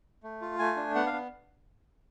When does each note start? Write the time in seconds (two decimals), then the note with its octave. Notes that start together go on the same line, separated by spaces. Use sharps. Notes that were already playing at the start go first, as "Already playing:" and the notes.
0.23 A3
0.41 F4
0.59 A3 G#5
0.76 D4
0.95 B3 F#5
1.07 F5
1.13 B3